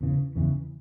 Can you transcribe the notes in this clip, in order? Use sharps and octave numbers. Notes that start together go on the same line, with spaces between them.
E2 C#3 E3
E2 C#3 E3